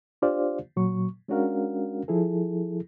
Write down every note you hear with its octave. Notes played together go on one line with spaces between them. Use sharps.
D4 F4 G4 C5 D5 F5
A#2 F#3 C#6
G#3 C#4 D4 F#4 A#4 F5
F3 E4 G#4 A4